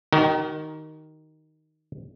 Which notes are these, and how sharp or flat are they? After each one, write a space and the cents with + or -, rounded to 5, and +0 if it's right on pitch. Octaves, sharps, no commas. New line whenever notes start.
D#3 +0 F#4 +45